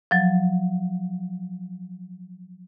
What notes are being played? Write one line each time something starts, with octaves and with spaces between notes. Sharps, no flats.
F3 F#3